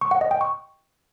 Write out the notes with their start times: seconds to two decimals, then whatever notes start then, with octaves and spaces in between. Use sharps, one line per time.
0.01 C#6
0.11 F#5
0.21 D#5
0.31 G5
0.41 C#6